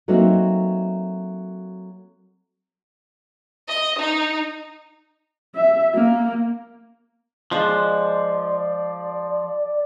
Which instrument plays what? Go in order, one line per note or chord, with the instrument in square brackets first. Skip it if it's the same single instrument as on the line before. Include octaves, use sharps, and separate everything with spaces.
[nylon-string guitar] F#3 A3 A#3 C4 D#4 F#4
[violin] D#5
D#4
[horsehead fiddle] E5
A#3
[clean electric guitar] F3 [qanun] G#3 D4 C5 [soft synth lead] D5